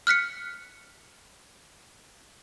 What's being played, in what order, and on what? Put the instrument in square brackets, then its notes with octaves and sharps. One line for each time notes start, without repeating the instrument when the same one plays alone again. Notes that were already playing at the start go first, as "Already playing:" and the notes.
[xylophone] F6 F#6 B6 C#7